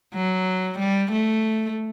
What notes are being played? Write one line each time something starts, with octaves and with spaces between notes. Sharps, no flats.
F#3
G3
A3